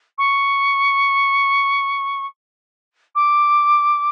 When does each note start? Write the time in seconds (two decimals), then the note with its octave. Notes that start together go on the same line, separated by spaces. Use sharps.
0.18 C#6
3.15 D6